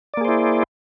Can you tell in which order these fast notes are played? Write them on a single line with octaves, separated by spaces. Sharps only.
D5 A#3 G#4 C5 E4